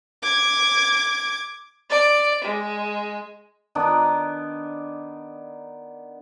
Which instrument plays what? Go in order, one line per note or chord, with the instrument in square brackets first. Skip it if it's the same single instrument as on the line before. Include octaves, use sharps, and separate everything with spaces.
[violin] D6 G#6
[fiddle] D5
G#3
[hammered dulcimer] D#3 B3 D4 D5